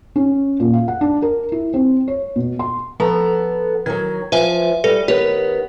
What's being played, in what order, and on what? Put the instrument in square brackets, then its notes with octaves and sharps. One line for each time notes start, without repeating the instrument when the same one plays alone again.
[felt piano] C#4
A#2
F5
F#5
D4
A#4
E4
C4
C#5
B2
C6
[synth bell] F3 [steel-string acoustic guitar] B3 A4 A#5
[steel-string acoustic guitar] D#3 F#3 [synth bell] G#6
[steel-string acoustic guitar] F3 [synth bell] B4 E5 G#5
[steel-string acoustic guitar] G3 [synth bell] A4 B4 A#6
[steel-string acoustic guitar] D#3 B3 [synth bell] G4 C#5